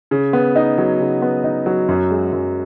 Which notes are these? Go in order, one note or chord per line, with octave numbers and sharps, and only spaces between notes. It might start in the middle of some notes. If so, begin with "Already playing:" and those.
C#3
B3
D#4
F#3
C#3
B3
D#4
F#3
F#2
G#3
F#2